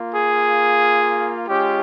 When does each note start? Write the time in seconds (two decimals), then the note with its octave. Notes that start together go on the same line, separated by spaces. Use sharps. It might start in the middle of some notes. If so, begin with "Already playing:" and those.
Already playing: A#3 F4
0.13 G#4
1.47 G#3 C#4 F4 G4